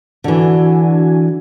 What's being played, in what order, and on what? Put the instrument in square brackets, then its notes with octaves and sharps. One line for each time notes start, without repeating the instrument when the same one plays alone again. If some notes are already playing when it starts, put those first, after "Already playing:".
[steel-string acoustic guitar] D3 E3 [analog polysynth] D4 F#4 G#5